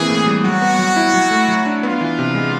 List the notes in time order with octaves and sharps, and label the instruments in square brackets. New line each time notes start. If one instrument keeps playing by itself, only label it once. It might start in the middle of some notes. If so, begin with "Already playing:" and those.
Already playing: [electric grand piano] E3 A#3 C4 [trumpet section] G#4
[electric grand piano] A2
G3
[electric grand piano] F#3 [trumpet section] F#4
[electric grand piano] B3
F#3
E4
F#3
A3
F#3
D4
[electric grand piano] B3 [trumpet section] F4
[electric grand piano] E3
C3
G#3